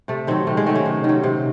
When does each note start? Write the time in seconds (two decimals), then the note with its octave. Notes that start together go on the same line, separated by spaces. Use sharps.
0.08 C3 A3
0.27 D#3 F#3 C4
0.47 C3 A3
0.57 G#3
0.66 D#3 F#3 A3
0.76 C#4
0.86 C3
1.04 D#3 F#3
1.23 C3